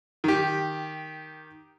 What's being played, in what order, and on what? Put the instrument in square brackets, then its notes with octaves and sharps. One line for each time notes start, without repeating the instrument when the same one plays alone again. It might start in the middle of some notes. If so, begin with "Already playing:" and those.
[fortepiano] D#3 G4